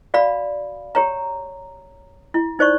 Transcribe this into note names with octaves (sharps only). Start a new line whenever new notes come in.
F#4 D5 F5 B5
G4 C#5 A#5
E4
D#4 C5 D5 C#6